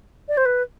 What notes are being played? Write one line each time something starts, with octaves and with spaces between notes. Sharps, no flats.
D5
C5
B4